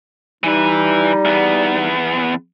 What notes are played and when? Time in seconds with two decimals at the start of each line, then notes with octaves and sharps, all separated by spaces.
0.44 E3 G3 D#4 B4
1.25 E2 B3